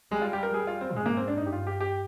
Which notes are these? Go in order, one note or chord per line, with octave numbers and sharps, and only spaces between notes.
G3 G#3
F4
G4
A#4
G3 G#4
F4
C4
G#2 G#3
A#3
C4
D4
G2 D#4
G4
F4
G4
G4